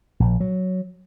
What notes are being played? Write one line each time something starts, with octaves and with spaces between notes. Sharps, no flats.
A#1
F#3